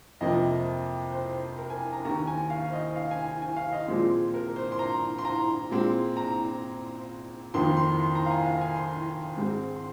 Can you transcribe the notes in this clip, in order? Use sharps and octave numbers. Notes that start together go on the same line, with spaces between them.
F2 C3 F3 A#3 D#5
C5
A#4
G#5
A#5
D#2 D#3 A#3 A#5
G#5
F5
C5
D#5
F5
G#5
G#5
G#5
F5
D#5
A#2 F3 G#3 C4
A#4
C5
C6
A#5
C6
A#5
A#2 G#3 C4
A#5
F2 D#3 A#3 C6
C6
C6
A#5
F5
G#5
F5
G#5
C6
G#2 G#3 C4
C6